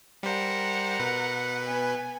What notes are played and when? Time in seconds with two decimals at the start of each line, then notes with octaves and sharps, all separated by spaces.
0.23 G3 A#4 C5 F#5
0.99 B2 B4
1.65 B3 G#5